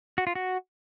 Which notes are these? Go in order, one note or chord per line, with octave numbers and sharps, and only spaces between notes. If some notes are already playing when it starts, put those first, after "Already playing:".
F#4
F4
F#4